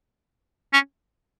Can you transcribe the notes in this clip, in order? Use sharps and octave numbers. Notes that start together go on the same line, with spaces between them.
C#4